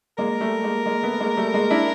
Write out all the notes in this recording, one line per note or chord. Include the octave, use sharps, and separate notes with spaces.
G#3 A#3 A#4
G3 A3
G#3 A#3
G#3 A#3
A3 B3
G#3 A#3
G3 A3
G#3 A#3
D4 E4